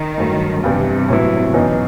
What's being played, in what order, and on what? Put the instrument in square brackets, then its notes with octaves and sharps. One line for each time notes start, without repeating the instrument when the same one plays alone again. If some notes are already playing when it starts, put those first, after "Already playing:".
Already playing: [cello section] D#3
[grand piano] G2 F#3 A3
[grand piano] G2 E3 G3 B3 [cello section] C3
[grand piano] A2 F#3 B3 E4
[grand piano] F#2 E3 B3 D#4 [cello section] B2